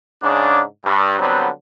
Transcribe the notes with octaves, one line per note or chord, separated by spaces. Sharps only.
G#2 C#3 D4
G2
D3 F#3 G3 B3 C4